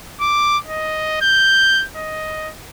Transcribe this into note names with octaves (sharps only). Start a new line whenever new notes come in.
D6
D#5
G6
D#5